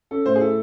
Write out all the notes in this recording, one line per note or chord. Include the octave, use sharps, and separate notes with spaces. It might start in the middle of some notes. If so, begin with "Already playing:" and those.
C#4 A4
A2 C5
G#4
E4 A4